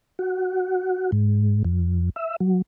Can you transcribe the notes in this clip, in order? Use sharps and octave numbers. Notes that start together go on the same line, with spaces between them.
F#4
G#2
F2
E5
F#3